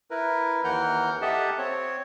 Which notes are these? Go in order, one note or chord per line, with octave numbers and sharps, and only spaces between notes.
E4 A#4 B4
D#2 E3 A#4 F#5 F6 G6
G4 A4 D#5 E5 F#5 A5
C4 C#5